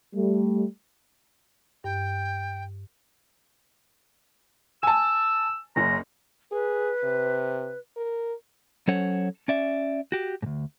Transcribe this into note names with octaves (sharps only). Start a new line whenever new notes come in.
G3 A3
G2 G5
G#5 A5 E6
F#1 F#2 A#5
G#4 B4
C3
A#4
F#3 C#4 A4 C5 C#5 F#5
C#4 D5 E5
F#4 G4
D2 G#2